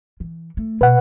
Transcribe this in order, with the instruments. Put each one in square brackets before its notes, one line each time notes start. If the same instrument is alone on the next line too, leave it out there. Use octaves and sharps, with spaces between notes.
[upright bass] E3
A3
[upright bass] B2 [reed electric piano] B4 F#5